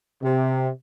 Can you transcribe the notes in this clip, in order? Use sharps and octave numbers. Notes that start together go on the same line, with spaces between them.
C3